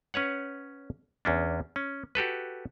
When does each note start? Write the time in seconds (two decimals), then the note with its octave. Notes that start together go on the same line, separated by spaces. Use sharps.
0.14 C#4 B4 C#5 F#5
1.25 E2 C#4 D4
1.76 C#4
2.15 F#4 G4 A4 B4